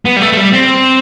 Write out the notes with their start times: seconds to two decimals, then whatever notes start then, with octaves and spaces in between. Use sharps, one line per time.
0.05 B3
0.16 G3
0.21 A3
0.33 A3
0.37 G3
0.53 C4